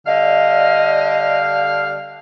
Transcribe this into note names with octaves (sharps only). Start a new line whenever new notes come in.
D3 G3 D#5 F5